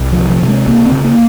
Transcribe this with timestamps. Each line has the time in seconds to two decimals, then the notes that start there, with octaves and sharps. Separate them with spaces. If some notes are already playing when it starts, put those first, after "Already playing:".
Already playing: C2
0.12 F3
0.18 C3
0.30 F3
0.42 C3
0.48 G#3
0.67 C#2 A#3
0.85 C4
0.92 C#3
1.04 A#3